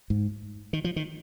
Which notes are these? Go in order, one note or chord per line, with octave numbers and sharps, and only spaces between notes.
G#2
D#3
F3
D#3